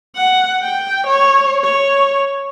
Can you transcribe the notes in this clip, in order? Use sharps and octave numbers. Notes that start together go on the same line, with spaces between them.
F#5
G5
C#5
C#5